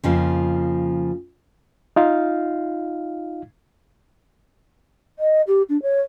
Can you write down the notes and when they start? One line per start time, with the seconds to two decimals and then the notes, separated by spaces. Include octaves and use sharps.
0.04 F2 C#3 F3 A#3
1.96 D#4 F4 F5
5.19 D#5
5.47 G4
5.69 D4
5.82 C#5